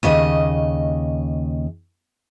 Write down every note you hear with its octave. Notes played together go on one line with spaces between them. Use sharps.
D#2 C#3 D#5